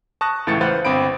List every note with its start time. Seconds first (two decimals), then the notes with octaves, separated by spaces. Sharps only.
0.21 A5 C#6 D#6 F#6 A#6
0.47 C#2 A2 E3 A6 C#7
0.61 B4 C5 F5 F#5 A6
0.85 G1 C4 B5 D7